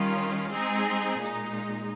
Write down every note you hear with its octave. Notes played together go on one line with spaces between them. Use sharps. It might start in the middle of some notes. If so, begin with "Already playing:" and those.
Already playing: D#3 G3 C#4 F4
G#3 C4 D#4 G#4
A#2 G#3 D#4